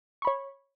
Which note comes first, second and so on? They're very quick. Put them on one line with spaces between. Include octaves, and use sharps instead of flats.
C#6 B5 C#5